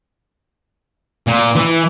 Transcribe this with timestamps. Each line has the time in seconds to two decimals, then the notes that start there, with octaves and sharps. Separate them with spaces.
1.27 A#2
1.56 E3